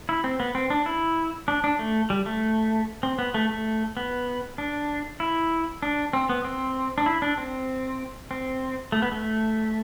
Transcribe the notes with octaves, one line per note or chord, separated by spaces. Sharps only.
E4
C4
B3
C4
D4
E4
D4
D4
A3
G3
A3
C4
B3
A3
A3
B3
D4
E4
D4
C4
B3
C4
D4
E4
D4
C4
C4
A3
B3
A3